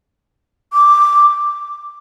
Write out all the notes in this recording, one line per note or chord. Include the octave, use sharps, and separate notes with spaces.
D6